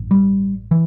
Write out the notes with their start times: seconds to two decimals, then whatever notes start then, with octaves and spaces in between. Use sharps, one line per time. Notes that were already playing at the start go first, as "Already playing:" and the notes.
Already playing: A1 G2
0.11 G3
0.71 E3